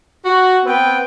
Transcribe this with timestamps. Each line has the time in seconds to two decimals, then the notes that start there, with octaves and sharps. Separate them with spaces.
0.24 F#4
0.65 B3 C4 B4 G5